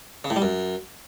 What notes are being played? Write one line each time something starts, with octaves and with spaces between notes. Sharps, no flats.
C#3
A2
G3
F#2